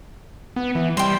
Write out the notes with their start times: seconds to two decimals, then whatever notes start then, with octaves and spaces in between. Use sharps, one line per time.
0.56 B3
0.75 E3
0.97 G3 C5 G5